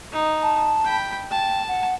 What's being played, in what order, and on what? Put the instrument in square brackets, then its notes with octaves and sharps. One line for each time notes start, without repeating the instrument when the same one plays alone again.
[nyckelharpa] D#4
[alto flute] A5
[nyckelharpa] G5 B5
[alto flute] G5 [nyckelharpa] A5
[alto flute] F#5